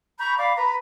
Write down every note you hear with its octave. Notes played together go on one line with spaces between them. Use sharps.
A#5 B5 C#6 G6
D5 F5 B5 D6
B4 A#5 B5